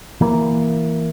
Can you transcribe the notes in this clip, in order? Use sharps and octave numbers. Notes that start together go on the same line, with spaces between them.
E3 A#3